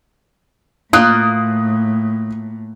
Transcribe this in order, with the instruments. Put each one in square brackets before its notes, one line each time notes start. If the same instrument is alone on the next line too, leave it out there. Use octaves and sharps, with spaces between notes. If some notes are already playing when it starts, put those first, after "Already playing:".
[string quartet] A2 [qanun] A#3 F4 [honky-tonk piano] D#6 F#6